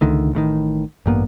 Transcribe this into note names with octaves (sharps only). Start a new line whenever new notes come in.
C#2 D3 D#3 A3
A1 A2 C3 D#3
A1 G2 A#3 B3